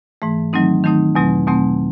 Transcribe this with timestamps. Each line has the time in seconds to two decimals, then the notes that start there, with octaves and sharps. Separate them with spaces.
0.22 G#2 E3 A3
0.53 D#3 F#3 A3 C4 D#4
0.84 D#3 F#3 A3 C4 D#4
1.15 E2 B2 F#3 A3 C4
1.47 E2 B2 F#3 A3 C4